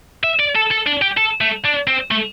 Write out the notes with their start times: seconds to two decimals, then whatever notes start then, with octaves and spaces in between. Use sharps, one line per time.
0.23 E5
0.39 D5
0.55 A4
0.71 A4
0.86 D4
1.02 G4
1.17 A4
1.41 A3
1.64 D4
1.87 C4
2.11 A3